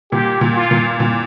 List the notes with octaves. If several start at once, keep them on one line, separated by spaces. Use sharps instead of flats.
A#2 G4
A#2
F4
A#2
A#2